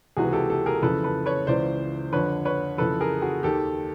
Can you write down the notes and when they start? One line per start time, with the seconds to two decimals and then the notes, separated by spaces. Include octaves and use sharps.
0.17 C#2 C3 E3 F#4 G#4
0.33 G4 A4
0.50 G4 A4
0.66 G#4 A#4
0.82 F2 C#3 E3 A4 B4
1.04 A4 B4
1.26 B4 C#5
1.47 C#2 C#3 E3 C5 D5
2.13 F2 D3 B4 C#5
2.45 B4 C#5
2.78 F2 C#3 E3 A4 B4
3.00 G#4 A#4
3.22 F#4 G#4
3.43 D#2 D#3 G4 A4